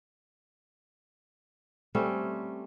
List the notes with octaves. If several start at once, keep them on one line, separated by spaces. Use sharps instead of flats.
G3 A3 C4 C#4